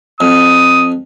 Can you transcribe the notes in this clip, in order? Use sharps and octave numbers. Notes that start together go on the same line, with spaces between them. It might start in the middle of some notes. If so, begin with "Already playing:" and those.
F2 D#6